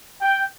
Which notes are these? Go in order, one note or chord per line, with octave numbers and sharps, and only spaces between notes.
G5